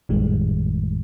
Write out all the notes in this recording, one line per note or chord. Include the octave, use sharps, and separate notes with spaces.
G#1 F2 A2 D#3 G3 G#3